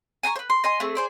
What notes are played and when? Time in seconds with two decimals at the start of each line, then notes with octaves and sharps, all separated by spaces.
0.23 G#5 A#5 C6 C#6
0.36 B4 C5
0.50 C6
0.64 D#5 G#5 C6
0.80 A3 C4 G#4
0.95 G#4 C5 D5